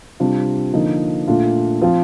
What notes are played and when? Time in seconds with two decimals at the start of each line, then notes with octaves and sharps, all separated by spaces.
0.20 C3 G3 D4 F4
0.73 D3 F3 A#3 D#4
1.27 A#2 A3 D4 F4
1.82 F3 C4 F4